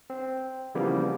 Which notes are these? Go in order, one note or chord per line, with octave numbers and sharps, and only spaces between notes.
C4
C#3 E3 F3 G3 A#3 B3